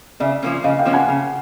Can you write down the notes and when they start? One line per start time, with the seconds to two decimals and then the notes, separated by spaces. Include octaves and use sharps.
0.20 C#3 D5 E5
0.43 F3 A#3 C#4
0.64 C#3 D#5 F5
0.78 F5 G5
0.85 F3 A#3 C#4
0.93 F#5 G#5
1.08 C#3